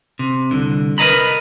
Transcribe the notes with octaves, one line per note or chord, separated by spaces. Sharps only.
C3
C2 D3
A#4 B4 D5 D#5 A#5 B5